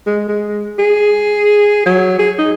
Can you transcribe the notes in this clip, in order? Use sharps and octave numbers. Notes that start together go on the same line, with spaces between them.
G#3
G#3
G#4
F#3
G#4
D#4